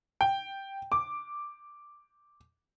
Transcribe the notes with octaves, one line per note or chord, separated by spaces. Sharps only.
G5
D6